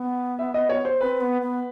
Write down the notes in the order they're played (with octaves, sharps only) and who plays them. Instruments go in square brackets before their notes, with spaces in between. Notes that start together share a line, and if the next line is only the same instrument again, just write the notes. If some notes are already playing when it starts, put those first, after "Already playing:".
Already playing: [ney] B3
[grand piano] E5
D#5
C#5
C5
[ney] C4 [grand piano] B4
[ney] B3
B3